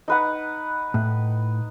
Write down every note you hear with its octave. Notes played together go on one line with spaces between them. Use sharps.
D#4 B4 F#5
A2